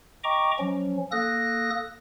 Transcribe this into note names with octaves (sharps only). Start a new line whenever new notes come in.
D#5 G5 A#5 C#6 D6
F3 F#3 C#4
A#3 A4 D#6 F#6 A#6